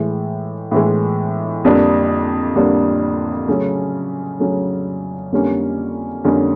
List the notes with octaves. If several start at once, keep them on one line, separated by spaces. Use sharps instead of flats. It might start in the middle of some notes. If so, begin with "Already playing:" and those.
Already playing: A2 E3 G#3
A2 E3 G#3
F2 D3 G3 A#3 D4
F2 D3 G3 A#3 D4
C#3 F#3 A3 C#4
C#3 F#3 A3 C#4
F2 D3 G3 A#3 C#4
F2 D3 G3 A#3 C#4